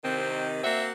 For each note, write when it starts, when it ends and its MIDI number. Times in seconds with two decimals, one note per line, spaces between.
0.04 0.62 48
0.04 0.62 51
0.04 0.47 60
0.63 0.92 58
0.63 0.92 60
0.63 0.92 66
0.63 0.83 76